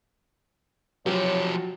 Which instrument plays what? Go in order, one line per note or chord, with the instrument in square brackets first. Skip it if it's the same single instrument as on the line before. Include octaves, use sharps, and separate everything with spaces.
[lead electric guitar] F3 G4 [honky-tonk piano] F#3 [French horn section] C#5